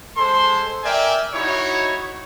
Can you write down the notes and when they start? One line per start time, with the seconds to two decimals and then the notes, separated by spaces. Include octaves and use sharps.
0.17 G#3 A4 C5 C6
0.84 A#4 D5 E5 G5 G#5
1.34 D#4 E4 F#4 C#5